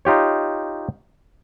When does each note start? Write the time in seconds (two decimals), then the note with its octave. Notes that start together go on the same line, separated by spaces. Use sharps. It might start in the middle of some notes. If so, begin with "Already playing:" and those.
0.05 D#4 F4 G4 C#5